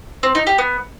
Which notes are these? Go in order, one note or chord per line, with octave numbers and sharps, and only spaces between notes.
C4
D#4
G4
B3